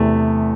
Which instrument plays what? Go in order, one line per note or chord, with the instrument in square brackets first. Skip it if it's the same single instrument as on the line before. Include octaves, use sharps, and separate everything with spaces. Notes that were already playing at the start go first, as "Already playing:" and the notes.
Already playing: [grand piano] E2 C3 E3 A3